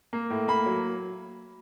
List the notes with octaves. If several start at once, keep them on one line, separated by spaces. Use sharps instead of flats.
A#3
A2
A#3 B5
F#3